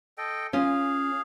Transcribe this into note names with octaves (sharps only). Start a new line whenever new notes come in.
A4 D#5 G5
C#4 F4 G#4 F5